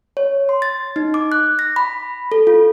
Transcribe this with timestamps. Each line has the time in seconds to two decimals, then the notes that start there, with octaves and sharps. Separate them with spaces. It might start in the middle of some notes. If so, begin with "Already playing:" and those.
0.17 C#5
0.49 C6
0.62 A6
0.96 D#4
1.14 D6
1.32 F#6
1.59 A#6
1.76 B5
2.32 A4
2.47 F4